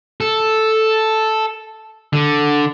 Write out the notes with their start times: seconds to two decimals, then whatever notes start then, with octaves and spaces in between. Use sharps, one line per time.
0.21 A4
2.13 D3